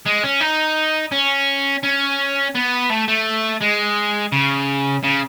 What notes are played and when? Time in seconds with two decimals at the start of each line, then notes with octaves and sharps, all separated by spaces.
0.06 G#3
0.23 C#4
0.40 D#4
1.12 C#4
1.84 C#4
2.55 B3
2.90 A3
3.08 A3
3.61 G#3
4.32 C#3
5.04 C#3